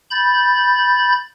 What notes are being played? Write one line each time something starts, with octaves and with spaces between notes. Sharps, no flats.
B5 G6 A6